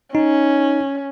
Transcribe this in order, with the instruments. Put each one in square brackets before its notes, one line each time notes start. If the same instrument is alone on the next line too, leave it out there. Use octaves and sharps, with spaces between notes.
[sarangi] C#4 [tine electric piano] D#4